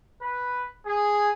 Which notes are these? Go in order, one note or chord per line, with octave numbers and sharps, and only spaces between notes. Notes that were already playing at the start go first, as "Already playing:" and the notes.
B4
G#4